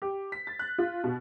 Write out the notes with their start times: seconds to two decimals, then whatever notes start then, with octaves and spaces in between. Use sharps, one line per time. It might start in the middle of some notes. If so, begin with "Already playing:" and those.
0.02 G4
0.32 B6
0.47 A6
0.59 F#6
0.78 F4
1.04 B2